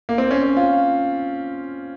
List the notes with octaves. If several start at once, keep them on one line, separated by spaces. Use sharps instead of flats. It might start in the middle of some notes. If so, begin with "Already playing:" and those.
A#3
C4
C#4
C#4
F4